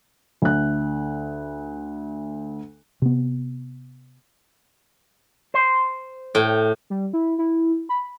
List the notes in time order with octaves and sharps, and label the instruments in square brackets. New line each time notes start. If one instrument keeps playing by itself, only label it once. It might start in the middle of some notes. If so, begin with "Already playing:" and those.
[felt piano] D2 F#6
[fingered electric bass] C3 B3
[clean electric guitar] C5
[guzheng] A2 G5
[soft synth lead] G3
E4
E4
B5